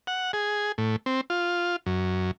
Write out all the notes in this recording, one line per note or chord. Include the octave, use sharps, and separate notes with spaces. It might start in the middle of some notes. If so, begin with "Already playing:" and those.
F#5
G#4
A2
C4
F4
F#2